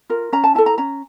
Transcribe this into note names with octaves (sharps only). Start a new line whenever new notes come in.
F4 A#4
C#4 A#5
A5
E4 A4 A5
A#5
C#4 A#5